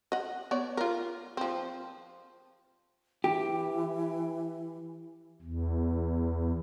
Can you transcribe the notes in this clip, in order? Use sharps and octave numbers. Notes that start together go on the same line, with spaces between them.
D#5 F#5
B3 C#5 D5
F4 A#4
F3 C4
E3 G4
E2